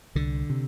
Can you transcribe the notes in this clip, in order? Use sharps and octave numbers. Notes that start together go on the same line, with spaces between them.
C2 D3
C3